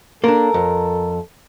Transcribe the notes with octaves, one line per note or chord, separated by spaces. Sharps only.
A#3 D4 A4 A#4
F2